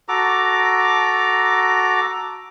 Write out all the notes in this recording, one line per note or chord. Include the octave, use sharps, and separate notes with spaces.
F#4 A4 A#5 D6